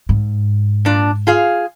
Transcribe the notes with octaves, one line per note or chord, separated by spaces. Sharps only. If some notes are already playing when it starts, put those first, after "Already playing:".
G#2
A#2 D4
F4 G#4 F5